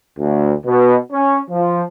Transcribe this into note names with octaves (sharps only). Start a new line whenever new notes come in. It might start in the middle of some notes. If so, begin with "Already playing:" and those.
D2
B2
C#4
F3